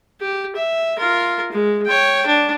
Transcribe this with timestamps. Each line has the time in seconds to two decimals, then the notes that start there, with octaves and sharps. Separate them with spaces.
0.21 G4
0.56 E5
0.98 F4 A#4
1.52 G#3
1.86 C#5 G5
2.26 D4